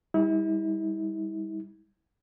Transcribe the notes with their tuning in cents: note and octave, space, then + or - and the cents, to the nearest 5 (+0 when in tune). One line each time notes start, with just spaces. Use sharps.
G3 +30 E4 -40